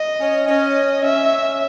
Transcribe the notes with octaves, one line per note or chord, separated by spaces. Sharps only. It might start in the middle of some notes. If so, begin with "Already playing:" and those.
Already playing: D#5
C#4
C#4 D#5
C#4 E5